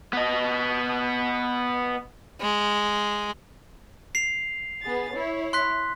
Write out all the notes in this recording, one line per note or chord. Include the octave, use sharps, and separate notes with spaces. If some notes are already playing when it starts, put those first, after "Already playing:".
B3 D#5
G#3
C7 F7
B3 G#4 A6
E4 C#5
C6 F#6 B6